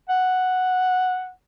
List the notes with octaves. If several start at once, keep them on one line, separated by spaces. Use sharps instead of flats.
F#5